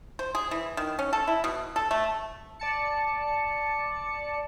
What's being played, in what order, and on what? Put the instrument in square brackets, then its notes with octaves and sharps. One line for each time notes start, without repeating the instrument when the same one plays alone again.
[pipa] C5
G#4
E3
D#3
C#4
A4
E4
B2
A4
A3
[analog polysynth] D5 A5 C#7